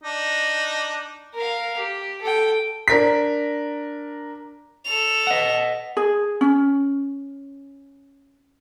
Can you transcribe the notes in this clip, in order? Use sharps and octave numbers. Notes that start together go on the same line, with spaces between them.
D4 D#4
A#4 F5
G4
A4 G5
D4 A#4 B6
A4 F7
D#5 F#5
G#4
C#4